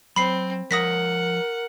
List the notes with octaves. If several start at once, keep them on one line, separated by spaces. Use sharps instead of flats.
F#3 C4 B5 C7
F3 A#4 C#5 F#5 D#6 A#6 B6